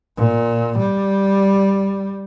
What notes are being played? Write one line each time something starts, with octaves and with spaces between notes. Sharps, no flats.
A#2
G3